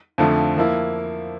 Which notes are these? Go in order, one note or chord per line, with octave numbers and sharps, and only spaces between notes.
F2 D3 F3 A3
F3 A#3 E4